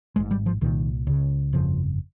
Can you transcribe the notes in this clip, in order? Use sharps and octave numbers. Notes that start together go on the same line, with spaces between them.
G#1 G#2 G#3
G3
F3
C2 A#2 D#3
C#2 C#3
G1 F2 C#3 F3